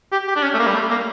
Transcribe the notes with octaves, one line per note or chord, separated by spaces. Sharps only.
G4
G4
D4
C#4
A3
A#3
G3
A3
A#3